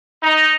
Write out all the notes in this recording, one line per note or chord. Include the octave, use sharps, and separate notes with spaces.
D#4